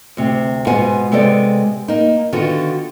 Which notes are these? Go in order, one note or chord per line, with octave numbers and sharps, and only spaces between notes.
D2 C3
G#2 B2 B3 F4 F#5 G#5
C3 G#3 B3 A4 D5
A#3 D#4
D3 D#3 B3 F4 F#4